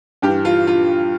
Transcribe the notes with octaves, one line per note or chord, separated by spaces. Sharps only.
G2 E3 G4
F4
F4